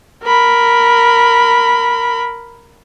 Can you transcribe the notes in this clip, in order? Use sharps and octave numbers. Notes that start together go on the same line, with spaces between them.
A#4 B5